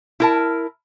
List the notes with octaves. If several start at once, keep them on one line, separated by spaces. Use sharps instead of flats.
E4 A#4 A5